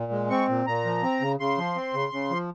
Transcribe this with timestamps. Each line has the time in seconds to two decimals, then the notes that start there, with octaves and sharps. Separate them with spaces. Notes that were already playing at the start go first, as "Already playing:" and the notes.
Already playing: A#2
0.12 G#3
0.30 C4 C#6
0.49 A#2
0.67 A#2 A#5
0.85 F3
1.03 C4
1.21 C#3
1.40 C#3 C6
1.58 F3
1.76 C4
1.94 C#3
2.13 C#3
2.30 F3